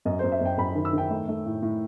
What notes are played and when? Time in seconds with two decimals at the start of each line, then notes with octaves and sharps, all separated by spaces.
0.05 F#2 D#5
0.19 F#2 C5
0.32 E5
0.41 F#2 G5
0.58 F#2 B5
0.75 D#3
0.85 E6
0.93 D#3 G5
1.10 A3
1.28 A3
1.46 A2
1.63 A2